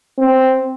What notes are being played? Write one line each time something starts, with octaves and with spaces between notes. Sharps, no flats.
C4